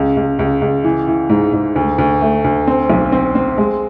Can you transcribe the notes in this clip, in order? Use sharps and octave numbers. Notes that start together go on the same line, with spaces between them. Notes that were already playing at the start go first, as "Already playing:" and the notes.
Already playing: C#2
C#2
C#2
C#2
E3
E3
G#2
G#2
D2
D2
A3
D2
C4
B1
C4
C4
G#3